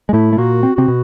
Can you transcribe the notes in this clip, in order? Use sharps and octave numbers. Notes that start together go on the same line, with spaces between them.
G#3
A2 A3 E4
A3
A#2 A#3 F#4
C4
C3 C4 F#4
B2